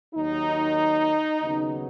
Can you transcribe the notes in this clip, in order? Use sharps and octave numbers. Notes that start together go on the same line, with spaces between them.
D#2 D#3 F#3 D#4
D#2 C#3 F#3 B3